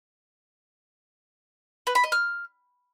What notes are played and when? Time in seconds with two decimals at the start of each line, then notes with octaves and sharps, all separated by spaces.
1.87 B4
1.95 B5
2.04 D#5
2.12 F6